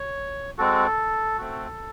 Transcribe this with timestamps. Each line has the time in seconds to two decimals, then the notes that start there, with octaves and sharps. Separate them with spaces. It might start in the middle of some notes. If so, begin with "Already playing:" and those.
Already playing: C#5
0.58 G#3 C4 F#4 A4
1.38 A3 C4 F#4